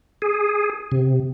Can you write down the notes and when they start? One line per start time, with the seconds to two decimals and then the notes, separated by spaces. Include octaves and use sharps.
0.22 G#4
0.92 C3